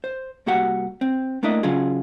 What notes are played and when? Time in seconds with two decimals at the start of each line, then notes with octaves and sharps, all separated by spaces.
0.04 C5
0.46 C2 A#3 F#4 G4 F#5
1.01 C4
1.43 A3 A#3 D4 E4 D#5 E5
1.63 C#3 F#3 C#4 F4 G#4